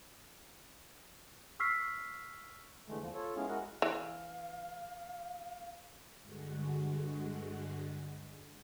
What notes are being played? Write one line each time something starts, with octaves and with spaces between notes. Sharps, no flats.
C#6 E6 F6 B6 C7
D3 E3 G#3 A3
E2 F3
F4 A4 C#5
G#3 B3 C#4 E4 G#4 F5
G#3 E4 F#4 A#4 D#5 F#5
E3 F5
G2 D3 G#3 F#4